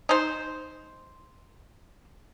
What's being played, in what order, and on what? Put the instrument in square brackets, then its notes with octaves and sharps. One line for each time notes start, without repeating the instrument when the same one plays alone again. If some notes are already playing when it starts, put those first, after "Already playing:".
[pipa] D#4 C5